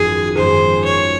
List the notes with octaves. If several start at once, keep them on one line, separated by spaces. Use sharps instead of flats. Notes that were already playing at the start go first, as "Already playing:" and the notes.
Already playing: G#1 F#2 F3 G#4
G#1 F#2 F3 G#3 C5
C#5